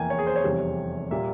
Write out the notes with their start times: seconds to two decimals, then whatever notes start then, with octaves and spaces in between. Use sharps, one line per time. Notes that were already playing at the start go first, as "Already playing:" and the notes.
Already playing: F1 E2 E3 A#3 G5 G#5
0.10 C#5
0.19 G#4
0.27 C5
0.36 C#5
0.44 F1 E2 C3 G3
1.11 A#2 G3 A#3 E5